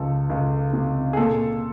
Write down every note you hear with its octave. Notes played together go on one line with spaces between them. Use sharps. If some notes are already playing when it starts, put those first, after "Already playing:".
Already playing: C#2 F3 A4
C#2
C3
G#4
A#2 A4